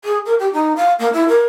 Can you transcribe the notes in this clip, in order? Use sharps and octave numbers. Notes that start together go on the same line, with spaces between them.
G#4
A#4
G4
D#4
F5
A#3
E4
A#4